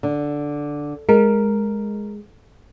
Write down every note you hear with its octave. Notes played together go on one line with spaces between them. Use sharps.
D3
G#3 A#4